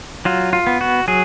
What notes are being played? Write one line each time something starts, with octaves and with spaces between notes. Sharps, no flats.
F#3 F4
F4
B3
F#4
F#3 G#4